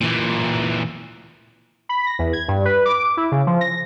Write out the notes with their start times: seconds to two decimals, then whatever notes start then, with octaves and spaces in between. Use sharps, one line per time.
0.01 A#2 E3
1.89 B5
2.06 A#6
2.19 E2
2.33 G#6
2.48 G2
2.65 B4
2.85 D6
3.17 E4
3.32 C#3
3.47 F3
3.61 A#6